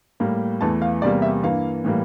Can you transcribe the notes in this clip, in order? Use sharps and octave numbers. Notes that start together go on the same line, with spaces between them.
A2 G3 A#3
E2 E3 A3 A5
F5
E2 C3 G3 A#3 D5
E5
G2 E3 A#3 F5
A2 E3 G3 A#3